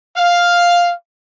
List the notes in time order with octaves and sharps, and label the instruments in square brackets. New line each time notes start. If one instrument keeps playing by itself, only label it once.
[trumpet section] F5